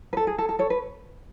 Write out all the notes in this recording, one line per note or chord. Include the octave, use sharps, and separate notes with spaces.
B4
A4
G#4
A4
A4
A4 C#5
B4